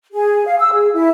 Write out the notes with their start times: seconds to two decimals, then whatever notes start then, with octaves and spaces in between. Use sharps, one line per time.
0.12 G#4
0.46 F5
0.59 E6
0.73 G#4
0.94 E4